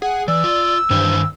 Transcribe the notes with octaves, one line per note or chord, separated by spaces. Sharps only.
G#4 F#5
E3 D5 E6
F4
G2 D#3 E3 C5